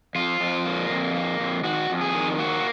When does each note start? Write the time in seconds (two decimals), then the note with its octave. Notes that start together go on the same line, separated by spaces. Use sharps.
0.15 F2 F4
0.40 F2
0.66 A#3
0.90 F2
1.14 A#3
1.40 F2
1.64 D#3 F#4
1.90 F2
2.01 G#4
2.15 D#3
2.39 A#3 F#4